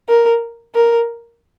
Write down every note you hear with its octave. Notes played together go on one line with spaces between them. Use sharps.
A#4
A#4